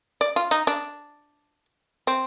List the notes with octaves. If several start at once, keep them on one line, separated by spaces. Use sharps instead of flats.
D5
F4
D#4
D4
C4